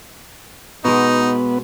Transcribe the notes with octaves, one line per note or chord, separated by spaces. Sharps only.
B2 G#3 B3 D#4